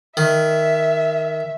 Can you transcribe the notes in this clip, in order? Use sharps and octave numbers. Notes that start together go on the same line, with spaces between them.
D#3 E5